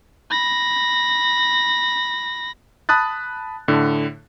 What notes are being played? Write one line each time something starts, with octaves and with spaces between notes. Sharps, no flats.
B5 A#6
A5 B5 D#6 F#6 A6
A2 D3